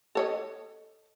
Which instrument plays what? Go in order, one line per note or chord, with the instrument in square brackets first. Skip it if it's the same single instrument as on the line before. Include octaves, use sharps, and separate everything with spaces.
[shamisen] A4 C#5 D#5